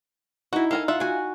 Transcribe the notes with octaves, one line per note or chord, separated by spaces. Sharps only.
D#4 E4 F#4
A4 A#4 F5 G#5
F4 E5 F#5
F#4 G#5